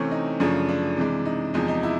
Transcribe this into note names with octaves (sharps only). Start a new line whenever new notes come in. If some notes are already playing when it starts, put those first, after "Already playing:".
Already playing: C3 E3 A3 C4 C#4
D#4
F#2 C#3 F3 A3 D4
D4
C3 E3 G#3
D#4
E2 C3 F3 G#3 D#4
D#4
E4